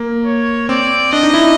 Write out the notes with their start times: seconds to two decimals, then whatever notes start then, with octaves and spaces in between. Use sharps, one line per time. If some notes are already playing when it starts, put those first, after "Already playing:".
Already playing: A#3
0.25 C#5
0.69 C4 D5
1.12 D4 D#5
1.23 D#4
1.34 E4